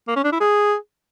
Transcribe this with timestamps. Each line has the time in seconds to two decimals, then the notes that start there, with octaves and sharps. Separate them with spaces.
0.08 A#3
0.16 C#4
0.24 D4
0.32 E4
0.40 G#4